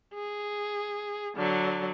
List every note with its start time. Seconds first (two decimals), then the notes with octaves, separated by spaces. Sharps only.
0.14 G#4
1.37 D3 F#3